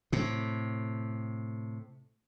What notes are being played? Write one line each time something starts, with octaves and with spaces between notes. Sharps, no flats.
A2 C3